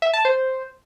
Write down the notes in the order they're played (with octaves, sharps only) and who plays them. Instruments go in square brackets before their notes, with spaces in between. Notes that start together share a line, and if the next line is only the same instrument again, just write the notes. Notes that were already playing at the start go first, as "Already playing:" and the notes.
[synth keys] E5
A5
C5